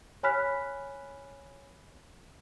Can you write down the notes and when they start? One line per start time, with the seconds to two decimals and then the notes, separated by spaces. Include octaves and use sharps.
0.23 C#5 G#5 B5 F6 F#6 B6